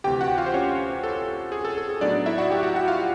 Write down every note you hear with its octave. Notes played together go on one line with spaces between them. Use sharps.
D2 C3 E3 G4 G5
F#4 F#5
F4 F5
C5
C#4 C#5
A4
G#4
A4
A4
G#4
A2 F#3 B3 D4 D#4 D5
E4 E5
F#4 F#5
G4 G5
F#4 F#5
F#4 F#5
F4 F5